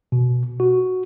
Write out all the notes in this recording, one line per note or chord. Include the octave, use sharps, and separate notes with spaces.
B2
F#4